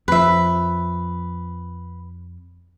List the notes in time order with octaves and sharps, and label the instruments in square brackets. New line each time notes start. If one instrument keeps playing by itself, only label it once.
[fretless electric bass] F2 F3 [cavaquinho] B4 E5